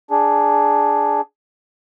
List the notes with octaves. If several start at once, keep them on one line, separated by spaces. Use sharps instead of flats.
D4 G#4